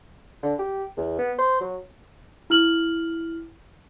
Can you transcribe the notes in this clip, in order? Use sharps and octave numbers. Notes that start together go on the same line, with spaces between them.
D3
G4
E2
B3
C5
F#3
E4 F6 F#7